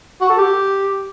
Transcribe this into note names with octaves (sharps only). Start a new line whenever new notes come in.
F#4
A4
G4